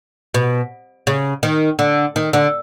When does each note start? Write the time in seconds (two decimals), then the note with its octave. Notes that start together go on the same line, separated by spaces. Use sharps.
0.34 B2
1.07 C#3
1.43 D#3
1.79 D3
2.16 D#3
2.33 D3